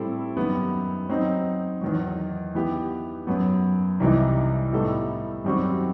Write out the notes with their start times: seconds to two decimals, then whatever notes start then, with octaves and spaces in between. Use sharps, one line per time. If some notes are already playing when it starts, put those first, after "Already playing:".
Already playing: A2 G3 C4 E4 A4
0.36 F#2 D#3 G3 B3
1.09 F#3 C4 D#4
1.81 E2 D#3 F#3
2.54 E3 B3 E4 G4
3.27 F#2 F#3 B3
4.00 C2 C3 E3 G3 D#4
4.72 A2 G3 B3 D#4 A4
5.44 F#2 D#3 G3 C4 F#4